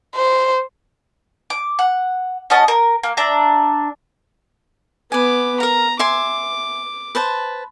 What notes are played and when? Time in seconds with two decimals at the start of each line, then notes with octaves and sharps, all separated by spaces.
0.15 C5
1.50 D6
1.79 F#5
2.50 C#4 F#4 D#5 A5
2.68 A#4
3.03 A#3
3.17 D4 E5 A#5
5.12 B3 B4 G#5 D6
5.60 A#4 F5 A#5
5.99 E5 G#5 C6 D6
7.15 B4 C5 A5